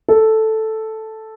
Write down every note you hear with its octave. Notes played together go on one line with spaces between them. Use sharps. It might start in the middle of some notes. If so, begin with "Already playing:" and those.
A4